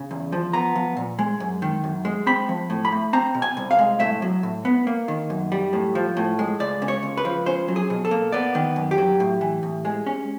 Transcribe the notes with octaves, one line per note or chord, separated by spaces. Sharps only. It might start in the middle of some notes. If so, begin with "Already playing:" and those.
Already playing: C#3
E2
F3
B3 A#5
F3
A#2
G#3
F#2
D#3
F#2
G#3
C4 B5
F3
A2
B5
A3
C4 A#5
B2
G#5
C2
F5
G#3
A2 E5
F#3
A2
B3
A#3
D#3
F#2
G3
A2
F3
A2
G#3
C#2 D5
C#3
C#5
C#2
B4
F3
C#4 C5
F#3
G#4
B2
A4
A#3
B3 D5
D#3
F#2
G4
F#3
A2
E3
A2
G#3
C#4